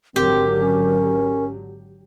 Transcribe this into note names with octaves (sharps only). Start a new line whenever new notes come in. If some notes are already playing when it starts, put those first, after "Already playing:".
G#1 D3 F#3 C4 G4 A#4
C#4